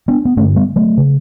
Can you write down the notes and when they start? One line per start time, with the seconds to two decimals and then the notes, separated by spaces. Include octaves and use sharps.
0.08 B3 D4
0.25 B3
0.37 G2 D3 A3 C#4
0.56 G3 B3
0.76 F#3 A3
0.97 C#3